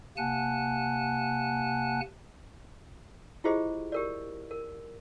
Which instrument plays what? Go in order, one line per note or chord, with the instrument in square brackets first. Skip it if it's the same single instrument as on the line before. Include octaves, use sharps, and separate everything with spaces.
[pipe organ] C3 A#3 F#5 G#5 A5 F#6
[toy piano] E4 F4 G4 G#4 C5 D#5
G4 A#4 D5
A#4